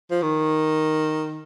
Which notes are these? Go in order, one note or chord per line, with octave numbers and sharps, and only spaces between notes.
F3
D#3